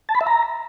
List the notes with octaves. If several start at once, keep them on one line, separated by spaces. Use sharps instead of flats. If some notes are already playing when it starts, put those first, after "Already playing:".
A5
B5
E5
A#5